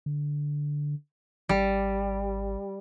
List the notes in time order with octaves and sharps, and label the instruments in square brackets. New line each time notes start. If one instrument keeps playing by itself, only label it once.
[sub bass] D3
[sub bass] G#1 [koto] G3